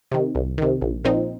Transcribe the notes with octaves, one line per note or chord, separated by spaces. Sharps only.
C3 D#3
C2
C3 D#3
A#1
A#2 F3 C4 D#4